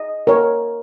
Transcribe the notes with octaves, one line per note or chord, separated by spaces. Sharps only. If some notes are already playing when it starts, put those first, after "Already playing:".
Already playing: D#5
A#4 C#5